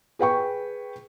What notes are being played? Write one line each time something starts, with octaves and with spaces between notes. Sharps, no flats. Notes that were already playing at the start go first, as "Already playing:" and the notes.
G#4 B4 G5 C#6